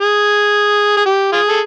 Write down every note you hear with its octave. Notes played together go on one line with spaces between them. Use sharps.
G#4
G#4
G4
F4 G#4
A4